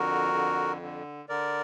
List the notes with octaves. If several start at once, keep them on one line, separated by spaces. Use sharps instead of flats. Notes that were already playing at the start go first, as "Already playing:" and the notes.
Already playing: F2 D3 F#4 A#4
D3
D3
D3 A#4 D5